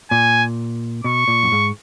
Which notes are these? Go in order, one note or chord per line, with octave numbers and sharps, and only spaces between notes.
A#2 G#5
B2 C#6
A#2
F#2
G#2